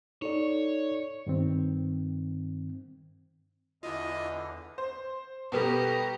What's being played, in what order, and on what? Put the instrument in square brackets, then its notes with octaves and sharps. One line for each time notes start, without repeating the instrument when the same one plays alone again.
[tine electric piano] D#4 A4 D5 [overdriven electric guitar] C#5
[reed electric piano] G2 D#3 C4
[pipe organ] E2 D3 [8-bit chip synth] E4 F4 [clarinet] D#5
[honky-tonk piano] C5
[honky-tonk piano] B2 G3 B3 [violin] G4 A#5 [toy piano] A4 B4 F#5